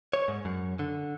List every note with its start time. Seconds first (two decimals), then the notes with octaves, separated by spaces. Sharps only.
0.13 C#5
0.28 G#2
0.45 F#2
0.79 D3